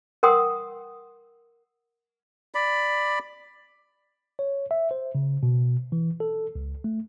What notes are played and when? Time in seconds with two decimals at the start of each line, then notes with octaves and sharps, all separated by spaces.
0.23 A#4 F#5 G5 C6 D#6
2.55 D5 B5
4.39 C#5
4.71 E5
4.91 C5
5.15 C#3
5.43 B2
5.92 E3
6.20 A4
6.55 C#2
6.84 A3